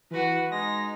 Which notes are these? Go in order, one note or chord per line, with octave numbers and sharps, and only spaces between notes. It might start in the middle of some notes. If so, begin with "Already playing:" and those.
E3 F#4 B4
G#3 D#4 A#6